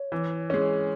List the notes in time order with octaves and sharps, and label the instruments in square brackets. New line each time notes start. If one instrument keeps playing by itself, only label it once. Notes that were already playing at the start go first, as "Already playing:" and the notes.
Already playing: [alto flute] C#5
[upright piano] E3
G#3 C#4